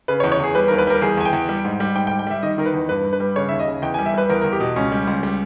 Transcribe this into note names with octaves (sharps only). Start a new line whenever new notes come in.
C#3 B4
C#5
E2
C#5
E2 G#4
G3 B4
D#2 A#4
B4
G3 A#4
E2 G#4
E2 G#5
G5
E2
G3
G#2
G3
G#2 G5
G5
G3
G5
G3 E5
D#3 D#5
D#3 A#4
B4
E2
G2 B4
G2
B4
G3
C#3 C#5
D#2 E5
D#5
C#3
E2 G5
G3 G#5
E5
G3 B4
E2 A#4
E2 A#4
G4
B2
C#2 C#4
G3
C#2
G3